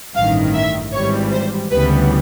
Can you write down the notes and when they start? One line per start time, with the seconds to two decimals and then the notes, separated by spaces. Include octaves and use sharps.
0.15 A1 G2 D#3 F5
0.54 E5
0.93 G#1 G#2 E3 G3 C#5
1.31 C5
1.71 D2 C#3 E3 G3 B3 B4